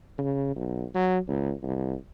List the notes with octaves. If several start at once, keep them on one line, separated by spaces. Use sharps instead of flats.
C#3
B1
F#3
C#2
C2